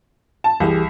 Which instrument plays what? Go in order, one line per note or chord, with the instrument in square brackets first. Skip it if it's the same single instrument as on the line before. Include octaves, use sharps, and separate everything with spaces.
[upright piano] A5
[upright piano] C2 [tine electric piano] E3 G4 G#4